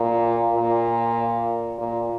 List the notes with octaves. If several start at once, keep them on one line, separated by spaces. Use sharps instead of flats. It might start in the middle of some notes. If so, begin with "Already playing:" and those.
Already playing: A#2
A#2
A#2